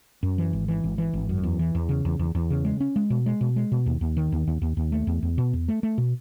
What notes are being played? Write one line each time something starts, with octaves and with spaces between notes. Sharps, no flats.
F#2
E3
G#1
E3
G#1
E3
G#1
F#2
E2
E3
E2
C#3
E2
E2
E2
C#3
G#3
C#4
G#3
B2
G#3
B2
G#3
B2
D#2
D#2
D#3
D#2
D#2
D#2
D#2
A3
E2
E2
B2
E2
A3
A3
B2